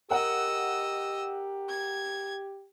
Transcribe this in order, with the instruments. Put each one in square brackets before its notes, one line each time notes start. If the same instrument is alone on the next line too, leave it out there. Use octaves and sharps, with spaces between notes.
[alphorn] G4 [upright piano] A#4 F#5 [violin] D#5 E6
[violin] G#6